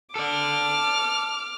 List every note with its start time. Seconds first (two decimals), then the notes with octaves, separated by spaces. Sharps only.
0.16 A4 D5 D6 F6